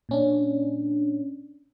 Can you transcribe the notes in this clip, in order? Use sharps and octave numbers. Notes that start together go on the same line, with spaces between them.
A#2 C#4 D4